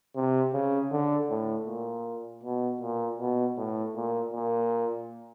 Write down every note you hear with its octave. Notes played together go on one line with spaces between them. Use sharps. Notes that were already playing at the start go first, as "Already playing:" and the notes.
C3
C#3
D3
A2
A#2
B2
A#2
B2
A2
A#2
A#2